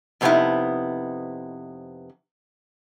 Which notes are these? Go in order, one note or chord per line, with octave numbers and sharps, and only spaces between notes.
F2 C3 B3 C4 D#4 E4